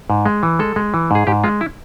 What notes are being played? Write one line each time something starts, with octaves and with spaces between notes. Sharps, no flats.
G#2
G#3
E3
G#3 A4
G#3
E3
G#2 G#4
G#2 G4
G#3 F4
E4